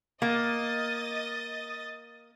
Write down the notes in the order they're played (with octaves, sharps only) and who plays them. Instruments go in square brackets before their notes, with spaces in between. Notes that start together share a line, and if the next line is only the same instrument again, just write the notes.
[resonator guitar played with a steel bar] A#3 [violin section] D#5 D#6 A6